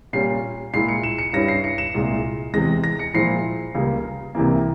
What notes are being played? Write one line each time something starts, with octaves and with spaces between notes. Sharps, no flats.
A#2 G3 C#4 C7
A#2 G#3 E4 C7
C#7
E7
C#7
G2 G3 C#4 E4 A#6
C7
C#7
E7
C2 A#2 G#3
E2 C3 E3 G#3 A#6
A#6
C#7
A#2 F3 G#3 E4 C7
C#2 C#3 G3 A#3
C2 C3 E3 A#3